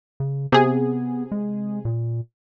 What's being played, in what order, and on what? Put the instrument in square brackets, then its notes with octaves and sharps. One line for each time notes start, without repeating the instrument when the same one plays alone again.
[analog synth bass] C#3
[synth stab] C3 G#4 [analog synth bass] B3
[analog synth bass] G#3
A#2